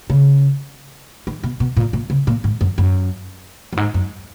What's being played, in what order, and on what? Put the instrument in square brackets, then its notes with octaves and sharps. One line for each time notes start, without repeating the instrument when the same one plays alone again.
[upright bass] C#3
D#3
B2
B2
A#2
A#2
C#3
A#2
G#2
F#2
F#2
F#2
G#2
F#2